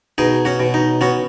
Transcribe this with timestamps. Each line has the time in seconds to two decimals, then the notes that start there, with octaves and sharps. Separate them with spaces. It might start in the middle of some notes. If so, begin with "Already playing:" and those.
0.18 B2 D#4 G#4
0.45 C#4 F#4
0.60 B2
0.74 D#4
1.01 B3 C#4 F#4